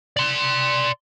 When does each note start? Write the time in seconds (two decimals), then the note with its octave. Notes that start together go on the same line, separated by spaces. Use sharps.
0.17 D5 C6